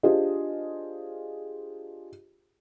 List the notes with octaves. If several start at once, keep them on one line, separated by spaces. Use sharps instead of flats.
D4 F4 G4 G#4 C5 D#5